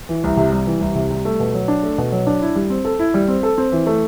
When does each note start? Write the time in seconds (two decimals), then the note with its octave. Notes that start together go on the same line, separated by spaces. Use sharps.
0.09 E3
0.24 C2
0.37 C3
0.52 G3
0.67 E3
0.81 C2
0.95 C3
1.10 G3
1.25 A3
1.40 B2
1.54 F#3
1.68 D4
1.83 A3
1.98 B2
2.12 F#3
2.27 D4
2.42 E4
2.56 G3
2.70 C4
2.85 A4
2.99 E4
3.14 G3
3.28 C4
3.43 A4
3.58 C4
3.72 E3
3.86 A3